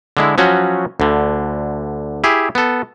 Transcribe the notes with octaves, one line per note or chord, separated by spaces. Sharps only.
D3 G#3 E4
F3 F#3 C#4 F#4
D2 D3
E4 G4 G#4
B3 A4